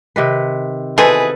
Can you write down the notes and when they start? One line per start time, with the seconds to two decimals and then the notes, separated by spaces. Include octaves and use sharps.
0.16 C3 D#3 B4
0.98 B2 E3 G#4 A4 B4 C5